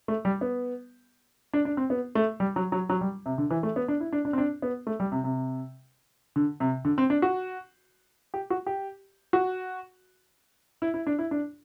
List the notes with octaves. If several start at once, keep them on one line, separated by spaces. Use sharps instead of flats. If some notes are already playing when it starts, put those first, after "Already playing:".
A3
G3
B3
D4
D4
C4
B3
A3
G3
F#3
F#3
F#3
G3
C3
D3
E3
A3
B3
D4
E4
D4
D4
C4
D4
B3
A3
G3
C3
C3
D3
C3
D3
C4
D4
F#4
G4
F#4
G4
F#4
E4
E4
D4
E4
D4